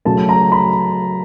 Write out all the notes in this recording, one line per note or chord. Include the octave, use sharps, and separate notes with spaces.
C#3 F#3 A3 A5
A#5
B5